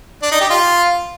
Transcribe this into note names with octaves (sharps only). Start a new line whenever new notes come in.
D4
D#4
G4
F4